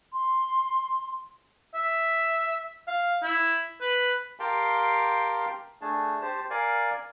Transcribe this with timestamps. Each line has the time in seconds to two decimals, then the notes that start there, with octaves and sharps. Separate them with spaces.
0.13 C6
1.74 E5
2.88 F5
3.23 E4
3.81 B4
4.40 G4 A#4 F5 G5 A5 C6
5.81 A3 D4 G#4 A5
6.22 G4 C5 A5
6.50 A#4 D5 F5 G#5